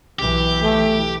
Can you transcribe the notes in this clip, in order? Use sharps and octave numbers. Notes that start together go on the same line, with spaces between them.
B1 E3 G4
A3